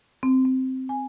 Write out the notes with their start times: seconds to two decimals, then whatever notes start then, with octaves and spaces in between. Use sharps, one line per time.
0.23 C4
0.45 C4
0.89 G#5